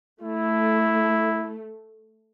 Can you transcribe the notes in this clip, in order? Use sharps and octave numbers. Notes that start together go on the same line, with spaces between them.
A3 E4